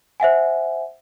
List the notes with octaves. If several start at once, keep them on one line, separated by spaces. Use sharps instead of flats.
C5 E5 F#5 G#5